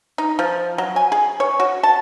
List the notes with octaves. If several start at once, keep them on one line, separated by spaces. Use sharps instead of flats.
D#4
F3
F#3
G#5
G#4
C#5
F#4
A5